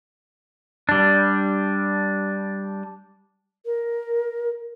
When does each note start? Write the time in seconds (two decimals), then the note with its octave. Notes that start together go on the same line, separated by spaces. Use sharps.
0.89 G3 D4
3.65 A#4